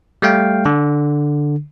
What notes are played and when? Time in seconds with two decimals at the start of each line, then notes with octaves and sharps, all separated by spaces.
0.22 G3 A3 F5 G5
0.65 D3